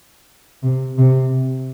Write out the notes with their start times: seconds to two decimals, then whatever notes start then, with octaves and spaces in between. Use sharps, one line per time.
0.63 C3
0.98 C3